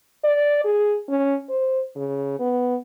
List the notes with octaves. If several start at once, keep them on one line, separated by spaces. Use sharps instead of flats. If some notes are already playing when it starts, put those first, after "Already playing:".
D5
G#4
C#4
C5
C#3
B3